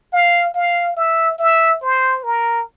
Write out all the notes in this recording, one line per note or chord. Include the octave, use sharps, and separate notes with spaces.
F5
F5
E5
E5
C5
A#4